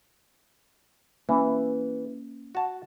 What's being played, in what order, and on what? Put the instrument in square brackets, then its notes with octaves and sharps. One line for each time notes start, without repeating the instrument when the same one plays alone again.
[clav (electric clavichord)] E3 [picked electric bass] A#3 C#4
[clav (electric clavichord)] F#4 A5